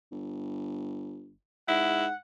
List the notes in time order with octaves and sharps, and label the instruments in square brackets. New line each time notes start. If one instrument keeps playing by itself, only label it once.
[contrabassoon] G1
[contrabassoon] G#2 [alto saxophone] E4 [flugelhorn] F#5